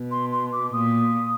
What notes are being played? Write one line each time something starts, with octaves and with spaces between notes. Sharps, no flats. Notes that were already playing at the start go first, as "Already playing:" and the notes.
Already playing: B2
C6
C6
D6
A#2 D#6